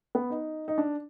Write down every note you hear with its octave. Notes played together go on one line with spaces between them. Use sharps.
B3
D#4
D#4
D4